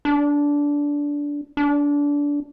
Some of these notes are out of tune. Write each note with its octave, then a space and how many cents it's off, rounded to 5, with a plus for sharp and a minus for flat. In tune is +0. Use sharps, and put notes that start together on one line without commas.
D4 -15
D4 -20